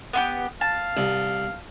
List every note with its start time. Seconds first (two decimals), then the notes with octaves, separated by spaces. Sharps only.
0.13 B3 F4 G4
0.61 F5 A5
0.97 C2